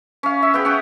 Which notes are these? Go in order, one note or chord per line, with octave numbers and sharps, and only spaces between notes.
C#4 F5
E5
B3 G#4 G5
C#4 F#5